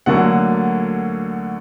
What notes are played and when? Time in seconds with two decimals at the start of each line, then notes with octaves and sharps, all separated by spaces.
0.06 D2 D3 F#3 A#3 F#5